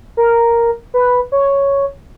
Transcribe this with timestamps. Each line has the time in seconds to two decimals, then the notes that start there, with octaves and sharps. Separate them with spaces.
0.17 A#4
0.94 B4
1.32 C#5